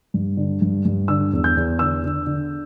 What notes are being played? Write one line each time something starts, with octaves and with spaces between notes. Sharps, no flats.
G2
D3
G2
G2
D3 E6
E2
G6
E2
D3 E6
D3
D3